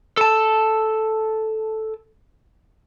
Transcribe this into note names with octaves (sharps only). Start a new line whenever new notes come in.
A4 A5